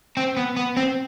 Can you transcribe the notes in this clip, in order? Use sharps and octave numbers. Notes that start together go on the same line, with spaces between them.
C4
B3
B3
C4